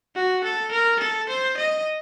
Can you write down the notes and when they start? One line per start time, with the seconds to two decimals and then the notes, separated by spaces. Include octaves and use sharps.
0.15 F#4
0.44 A4
0.71 A#4
0.99 A4
1.29 C5
1.57 D#5